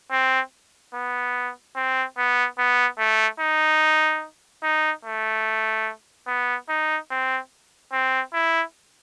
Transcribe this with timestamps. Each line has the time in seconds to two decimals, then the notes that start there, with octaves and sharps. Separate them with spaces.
0.12 C4
0.94 B3
1.76 C4
2.18 B3
2.58 B3
2.99 A3
3.40 D#4
4.63 D#4
5.05 A3
6.27 B3
6.69 D#4
7.11 C4
7.92 C4
8.34 E4